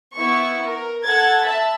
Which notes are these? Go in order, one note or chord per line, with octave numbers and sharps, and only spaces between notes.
B3 E4 C#6
A#4
A4 F#5 G#6 A6
E5 A5 B5